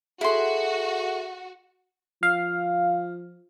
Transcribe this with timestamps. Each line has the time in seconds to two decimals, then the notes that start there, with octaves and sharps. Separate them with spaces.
0.21 E4 F#4 G#4 A4 C6
2.23 F3 F5